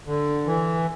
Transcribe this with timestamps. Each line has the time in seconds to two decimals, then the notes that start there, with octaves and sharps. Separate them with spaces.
0.07 D3
0.46 E3